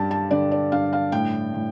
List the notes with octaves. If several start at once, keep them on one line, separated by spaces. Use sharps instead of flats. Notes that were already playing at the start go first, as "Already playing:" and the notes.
Already playing: G2 G3 G5 A5
A5
D3 D5
D5
G2 F5
F5
A2 G5
A2